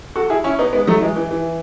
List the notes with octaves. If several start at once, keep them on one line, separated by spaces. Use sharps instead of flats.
F#4 A4
E4 G#4
C#4 E4
B3 D#4
G#3 B3
F#3 A3
E3 G#3
E3
E3